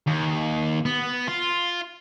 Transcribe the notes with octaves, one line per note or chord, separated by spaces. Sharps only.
D#2
B3
F4